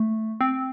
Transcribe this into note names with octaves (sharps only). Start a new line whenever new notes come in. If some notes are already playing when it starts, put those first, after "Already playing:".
Already playing: A3
C4